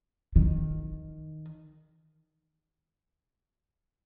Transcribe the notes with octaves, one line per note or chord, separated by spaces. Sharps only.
D#3